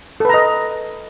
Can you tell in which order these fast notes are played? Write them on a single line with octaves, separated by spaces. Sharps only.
A4 B4 A#5 D#5